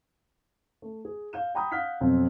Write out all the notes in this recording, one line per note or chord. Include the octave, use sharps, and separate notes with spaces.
A3
G#4
F5 G6 E7
F#5 G5 A#5 B5 D#6 G6
F5 F#5 F6 G6 B6
F2 B2 F#3 C4